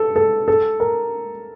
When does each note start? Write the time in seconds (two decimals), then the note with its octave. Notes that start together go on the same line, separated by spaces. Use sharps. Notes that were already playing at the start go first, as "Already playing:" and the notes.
Already playing: A4
0.16 A4
0.48 A4
0.80 A#4